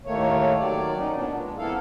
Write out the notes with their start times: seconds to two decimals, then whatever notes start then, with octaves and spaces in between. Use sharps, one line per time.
0.05 D#2 A2 D#3 A3 A#3 C#5
0.58 D#3 F#3 D5
0.97 D#2 C#4 D#4
1.14 A#2 B3 D4
1.34 G#3
1.58 F2 A#3 B3 E4 A4 F5